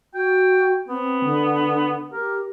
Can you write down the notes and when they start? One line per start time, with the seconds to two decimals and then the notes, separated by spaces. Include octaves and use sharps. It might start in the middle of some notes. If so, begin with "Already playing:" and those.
0.15 F#4 G5
0.88 B3 C4
1.24 D3
2.12 G4 A#4